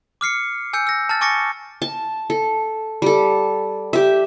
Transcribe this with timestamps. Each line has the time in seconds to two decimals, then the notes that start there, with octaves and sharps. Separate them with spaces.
0.21 D6 F6 C7 C#7
0.73 G#5 E6 G6 C#7
0.87 E6 A#6
1.09 A5 F6 A6
1.21 G#5 C#6 D6 A6 A#6 C#7
1.82 A5
2.30 A4
3.02 G3 A4
3.93 G4 E5